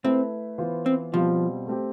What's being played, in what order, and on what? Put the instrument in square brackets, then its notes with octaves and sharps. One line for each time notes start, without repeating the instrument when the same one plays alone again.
[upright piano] A3 E4 B4 [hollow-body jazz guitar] C4
[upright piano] E3 B3 F4 C5
[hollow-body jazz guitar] C4
[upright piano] B2 G3 C4 F4 [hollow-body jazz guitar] F3
[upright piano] A3 C4 G4